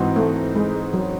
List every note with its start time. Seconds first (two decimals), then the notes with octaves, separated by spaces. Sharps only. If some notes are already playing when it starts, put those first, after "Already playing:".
Already playing: G#2 E3 C4 D#4 F#4
0.16 A3
0.55 G#3
0.93 F#3